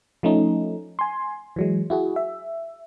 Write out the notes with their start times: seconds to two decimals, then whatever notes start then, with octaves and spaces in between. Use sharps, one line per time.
0.23 F3 A3 C#4 D#4
0.99 G#5 C6
1.56 E3 F#3 G#3
1.90 E4 F#4 G#4
2.16 E5